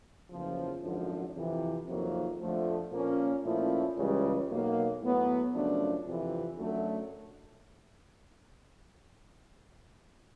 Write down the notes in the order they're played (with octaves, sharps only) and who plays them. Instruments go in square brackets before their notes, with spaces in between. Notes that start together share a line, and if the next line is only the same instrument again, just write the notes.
[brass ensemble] F#1 E2 C#3 F3
G#1 F#2 D3 F3
F2 C3 E3
F2 C3 D#3 F#3 A#3
F2 D3 F3 A3
A#2 F3 A#3 C#4
A#2 F3 A3 C#4 E4
C#2 C#3 E3 G3
B1 B2 F#3 A#3
A2 F#3 B3
F#2 C#3 F3 A3 D4
F2 C3 E3
F#2 D3 F#3 A3